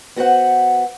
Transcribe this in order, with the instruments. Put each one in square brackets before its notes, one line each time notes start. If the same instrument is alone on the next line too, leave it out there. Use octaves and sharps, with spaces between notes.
[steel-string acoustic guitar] B3 F#4 C5 F#5